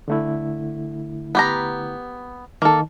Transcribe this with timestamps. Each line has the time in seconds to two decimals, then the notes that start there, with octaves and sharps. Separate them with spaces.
0.08 D3 A3 E4
1.35 B3 G4 A#5
2.62 D#3 A#3 A4